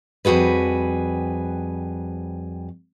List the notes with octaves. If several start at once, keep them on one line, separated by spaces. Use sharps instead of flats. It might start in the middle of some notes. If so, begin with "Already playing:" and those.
F2 G3 F#4 G#4 B4